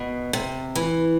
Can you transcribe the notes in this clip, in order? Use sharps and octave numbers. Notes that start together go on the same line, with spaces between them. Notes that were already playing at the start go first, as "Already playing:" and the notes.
Already playing: B2
C3
E3